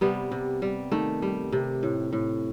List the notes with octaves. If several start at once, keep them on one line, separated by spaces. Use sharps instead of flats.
C3 G3 B3
C3
G3
D#3 A3
G3
C3
A2
A2